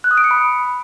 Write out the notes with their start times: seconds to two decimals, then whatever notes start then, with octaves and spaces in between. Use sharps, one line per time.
0.04 F#6
0.11 D#6
0.17 D7
0.24 C#7
0.31 B5